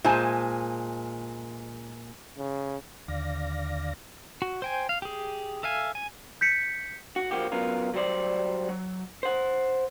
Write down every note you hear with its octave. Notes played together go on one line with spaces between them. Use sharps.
A#2 G#3 C5 G#5 A5
C#3
D#2 D3 D5 F5 A#6
F#4
C5 G5 G#5
F5
G4 G#4
A4 E5 F5 G#5
G#5
G6 B6 C#7
F#4
F3 A#3 F#4 G4
F#3 B3 C#4 F4 A#4
F#3 G3 C5 D5
F#3
C5 F#5